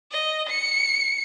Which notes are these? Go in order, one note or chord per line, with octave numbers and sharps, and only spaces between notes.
D#5
C#7